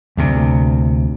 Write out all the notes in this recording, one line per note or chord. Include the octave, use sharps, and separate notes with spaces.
D2 C3